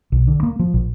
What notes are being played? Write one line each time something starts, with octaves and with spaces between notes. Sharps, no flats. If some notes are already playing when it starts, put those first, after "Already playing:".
B1
D3
A#3
F3
A#1